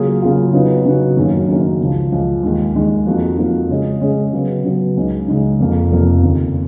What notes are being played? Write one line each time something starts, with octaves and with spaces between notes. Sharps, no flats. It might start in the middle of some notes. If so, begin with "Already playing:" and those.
Already playing: C#3 F#3 A#3 F4 G#4
C#3 F#3 A#3 F4 G#4
C#3 F#3 B3 D#4 F#4
C#3 F#3 B3 D#4 F#4
F#2 D#3 F#3 A#3 C#4
F#2 D#3 F#3 A#3 C#4
C#2 C#3 F3
C#2 C#3 F3
D#2 D#3 G#3
D#2 D#3 G#3
F2 F3 A#3 D#4 F#4
F2 F3 A#3 D#4 F#4
C#3 G#3 C#4 G#4 D#5
C#3 G#3 C#4 G#4 D#5
C#3 F#3 B3
C#3 F#3 B3
C#2 C#3 G#3 D#4
C#2 C#3 G#3 D#4
F1 F2 F3 A#3
F1 F2 F3 A#3
F1 D#2 C#3